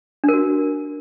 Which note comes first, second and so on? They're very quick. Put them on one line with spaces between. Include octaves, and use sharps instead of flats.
D4 A#4 F#4